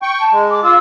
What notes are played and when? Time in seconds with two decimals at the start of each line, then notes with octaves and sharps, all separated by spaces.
0.02 G5 C#6
0.20 A5
0.32 G#3
0.50 D6
0.63 F4 E6